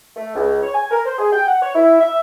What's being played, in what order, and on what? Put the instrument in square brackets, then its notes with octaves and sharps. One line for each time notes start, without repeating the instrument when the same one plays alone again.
[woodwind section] A3
C#2
C#5
G#5
A#4
C5
G#4
G5
F#5
C#5
E4
E5